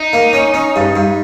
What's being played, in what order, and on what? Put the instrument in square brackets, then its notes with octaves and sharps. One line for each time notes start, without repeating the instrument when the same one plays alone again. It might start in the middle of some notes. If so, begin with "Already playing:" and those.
Already playing: [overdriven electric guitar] D#4
[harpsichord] A#3
C#4
C#4
G2
G2